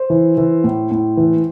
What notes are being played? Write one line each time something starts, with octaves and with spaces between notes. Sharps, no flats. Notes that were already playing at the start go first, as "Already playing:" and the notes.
Already playing: C5
E3
E3
A2
A2
E3